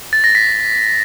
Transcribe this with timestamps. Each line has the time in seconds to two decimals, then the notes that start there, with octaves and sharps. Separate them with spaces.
0.13 A6
0.24 A#6
0.35 B6